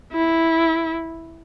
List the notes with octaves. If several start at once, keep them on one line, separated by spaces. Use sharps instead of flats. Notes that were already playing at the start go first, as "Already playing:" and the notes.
E4